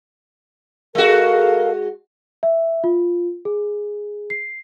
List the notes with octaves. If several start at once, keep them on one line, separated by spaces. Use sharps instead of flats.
G#3 F#4 A4 A#4 F5
E5
F4
G#4
C7